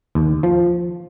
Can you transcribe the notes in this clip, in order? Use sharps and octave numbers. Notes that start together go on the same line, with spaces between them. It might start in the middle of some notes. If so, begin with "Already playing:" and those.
D#2
F3